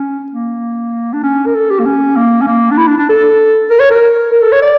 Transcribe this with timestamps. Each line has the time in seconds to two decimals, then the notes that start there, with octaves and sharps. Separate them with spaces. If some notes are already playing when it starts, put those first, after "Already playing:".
Already playing: C#4
0.32 A#3
1.13 D4
1.23 C#4
1.46 A#4
1.55 A4
1.70 G4
1.79 A#3
1.86 C#4
2.16 A#3
2.42 C#4
2.47 A#3
2.71 D4
2.78 E4
2.88 D4
2.98 D4
3.09 A4
3.70 A#4
3.80 C#5
3.90 A#4
4.32 A#4
4.42 A4
4.52 C#5
4.62 D5